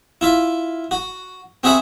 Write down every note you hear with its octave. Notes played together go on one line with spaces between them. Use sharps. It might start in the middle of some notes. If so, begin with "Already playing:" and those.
E4 F4 E5
F#4
C4 F#4 G#4 E5 F#5 B5